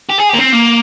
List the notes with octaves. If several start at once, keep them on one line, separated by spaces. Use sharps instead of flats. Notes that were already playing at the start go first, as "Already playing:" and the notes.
G4
G#4
A#3 G4
C4
A#3